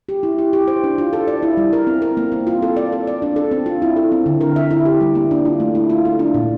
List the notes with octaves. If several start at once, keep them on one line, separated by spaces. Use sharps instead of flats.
G4
E4
G4
G4
C5
D4
F4
A4
D5
E4
G3
A#4
C4
A#4
A#3
C4
F4
A4
D5
A4
D5
D4
A4
C4
F4
E4
A4
C4
D3
A#4
E5
E4
G4
G3
A#3
D4
F4
A3
E4
F4
A4
D4
A#2